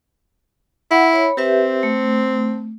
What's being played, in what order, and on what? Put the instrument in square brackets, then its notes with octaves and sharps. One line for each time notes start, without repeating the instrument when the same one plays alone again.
[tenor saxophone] E4 [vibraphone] F#5
[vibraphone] C#5 B5
[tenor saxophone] C4 [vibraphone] G4 B4 E5
[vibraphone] A3